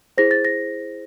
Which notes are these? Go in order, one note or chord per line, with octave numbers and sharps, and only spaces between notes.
E4 G#4 C5 A#6
A6
A#6